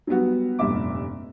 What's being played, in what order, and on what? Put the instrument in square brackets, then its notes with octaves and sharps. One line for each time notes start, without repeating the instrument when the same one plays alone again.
[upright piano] F#3 G3 B3 F#4
F1 G2 A#2 E5 D6